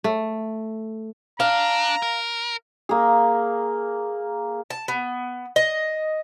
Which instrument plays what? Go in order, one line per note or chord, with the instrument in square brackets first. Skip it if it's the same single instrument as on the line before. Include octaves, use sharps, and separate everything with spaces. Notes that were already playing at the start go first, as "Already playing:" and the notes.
[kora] A3
[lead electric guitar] D4 [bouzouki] F5 [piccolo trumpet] A#5
[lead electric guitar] A#4
[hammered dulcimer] A#3 G#4
[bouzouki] A5
B3
D#5